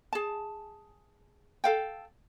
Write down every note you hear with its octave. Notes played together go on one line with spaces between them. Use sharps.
G#4 A5
A4 F5 G5